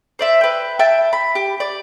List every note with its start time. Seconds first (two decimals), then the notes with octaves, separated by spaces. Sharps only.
0.19 C5 D5 E5
0.41 B4 G5
0.79 E5 G5 A5 E6
1.13 B5
1.35 G4
1.60 D5